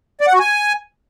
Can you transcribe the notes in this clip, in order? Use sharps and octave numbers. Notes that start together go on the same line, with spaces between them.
D5
F#5
F#4
G#5